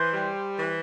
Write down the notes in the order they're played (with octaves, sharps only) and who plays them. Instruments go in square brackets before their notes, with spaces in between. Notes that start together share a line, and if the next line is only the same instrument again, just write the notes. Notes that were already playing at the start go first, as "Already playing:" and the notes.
Already playing: [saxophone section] E3 [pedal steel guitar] C5
[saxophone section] G3
E3